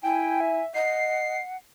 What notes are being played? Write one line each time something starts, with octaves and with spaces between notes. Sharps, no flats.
E4 G5 G#5
E5
D#5 F#5 C7